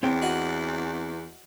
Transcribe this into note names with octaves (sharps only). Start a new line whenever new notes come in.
E2 C4 C#5 G5
F#4 D#5